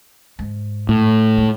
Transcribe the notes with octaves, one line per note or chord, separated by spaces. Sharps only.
G#2
A2
G#3